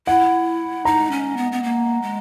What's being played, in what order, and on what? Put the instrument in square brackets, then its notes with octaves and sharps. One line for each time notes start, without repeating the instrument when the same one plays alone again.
[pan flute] E4 [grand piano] F#5
[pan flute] D#4 [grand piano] A#5
[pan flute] C#4
B3
B3
A#3
G#3